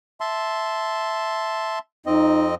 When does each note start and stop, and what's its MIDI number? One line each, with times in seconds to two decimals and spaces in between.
0.21 1.79 76
0.21 1.79 81
0.21 1.79 84
2.06 2.55 41
2.06 2.55 60
2.06 2.46 63
2.06 2.55 75